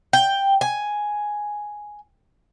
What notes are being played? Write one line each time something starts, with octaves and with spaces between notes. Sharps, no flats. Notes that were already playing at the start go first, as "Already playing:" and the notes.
G5
G#5